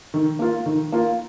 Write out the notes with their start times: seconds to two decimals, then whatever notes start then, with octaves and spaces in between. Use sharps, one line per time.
0.14 D#3
0.39 A#3 F4
0.66 D#3
0.92 A#3 F4